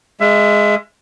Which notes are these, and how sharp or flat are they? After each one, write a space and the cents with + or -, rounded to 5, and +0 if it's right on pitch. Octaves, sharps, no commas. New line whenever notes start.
G#3 +0 E5 +25